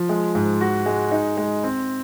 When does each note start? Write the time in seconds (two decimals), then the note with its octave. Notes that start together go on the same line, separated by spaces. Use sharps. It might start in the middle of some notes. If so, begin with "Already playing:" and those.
Already playing: F3
0.09 G#3
0.35 G#2
0.61 F#4
0.86 G#3
1.12 D#4
1.37 G#3
1.64 C4